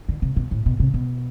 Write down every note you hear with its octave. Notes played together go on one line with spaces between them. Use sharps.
D3
C3
B2
A2
B2
C3
B2